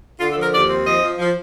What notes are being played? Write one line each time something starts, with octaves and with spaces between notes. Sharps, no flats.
D3 F4
A4
F3
A#4
D#2 D5
C4
F3 D#5
F3
F3